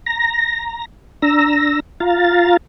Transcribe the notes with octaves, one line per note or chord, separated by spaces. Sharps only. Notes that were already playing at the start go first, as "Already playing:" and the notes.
A#5 A#6
D4 A#5 E6 A#6
F4 F5 A#5 A6